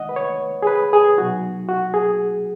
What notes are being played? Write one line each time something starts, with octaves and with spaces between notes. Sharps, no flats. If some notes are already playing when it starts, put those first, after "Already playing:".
Already playing: D#3 G#3 D#4 D#5 F#5
B4
C#5
G#4
B4
G#4
B2 F#3 D#4 F#4
F#4
G#4